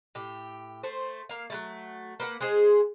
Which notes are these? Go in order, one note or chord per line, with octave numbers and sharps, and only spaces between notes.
A2 G4
A3 C5
A#3 F5
F#3 G3 A3
A#3 B4 E5 F#5
G#3 D#4 G#4 C5